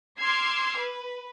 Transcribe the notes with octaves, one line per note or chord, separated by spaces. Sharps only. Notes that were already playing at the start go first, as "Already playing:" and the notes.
C6 D6 E6 F6 G#6 C7
B4